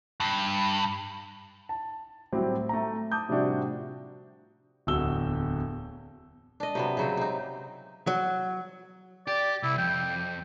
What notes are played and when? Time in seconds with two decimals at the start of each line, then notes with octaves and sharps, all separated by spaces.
0.20 G2
1.69 A5
2.33 A2 F#3 G3 C4 G4
2.69 A3 A#5
3.12 A5 D6 D#6 G6
3.29 A2 C3 F3 G3 D4 F#4
4.87 D1 E2 F#4 E6 G7
6.60 D4 D#5
6.75 C3 F#3 B3
6.97 C#3 F#3 C4
7.17 C3 D#4
8.07 F#3
9.27 G4 D5
9.63 C2 E4
9.78 F2 G5